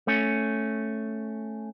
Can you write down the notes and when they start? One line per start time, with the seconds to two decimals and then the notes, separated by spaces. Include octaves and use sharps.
0.07 A3 C#4